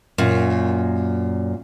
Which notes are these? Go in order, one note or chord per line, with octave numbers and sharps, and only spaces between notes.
F#2 A#2